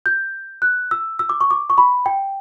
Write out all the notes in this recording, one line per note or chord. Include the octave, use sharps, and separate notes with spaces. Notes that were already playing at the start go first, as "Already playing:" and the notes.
G6
F#6
E6
E6
D6
C#6
D6
C#6
B5
G5